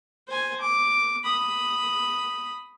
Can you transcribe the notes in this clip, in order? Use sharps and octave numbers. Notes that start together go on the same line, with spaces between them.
C5 G#5
D6
B5 D#6